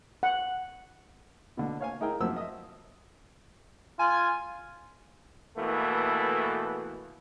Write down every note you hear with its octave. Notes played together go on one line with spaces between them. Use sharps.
F#5
B2 D3
C#5 F5 G#5
D#4 E4 G#4 A#4 G5
F#2 F3 E6
D#5 E5
F4 G#5
B2 E3 A3 A#3